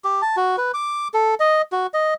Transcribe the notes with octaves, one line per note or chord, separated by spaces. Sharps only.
G4
A5
F#4
B4
D6
A4
D#5
F#4
D#5